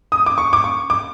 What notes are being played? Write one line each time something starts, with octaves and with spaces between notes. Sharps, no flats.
D#6
D6
C#6
D6
C#6
D6